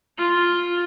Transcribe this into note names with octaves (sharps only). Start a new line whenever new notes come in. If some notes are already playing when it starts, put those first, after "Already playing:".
F4